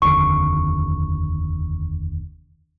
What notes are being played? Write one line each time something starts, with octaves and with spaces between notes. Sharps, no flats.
F1 D#2 D3 C#6